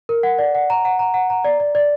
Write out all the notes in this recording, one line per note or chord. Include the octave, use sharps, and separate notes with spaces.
A#4
F#5
D5
F#5
A#5
F#5
A#5
F#5
A#5
D5
D5
D5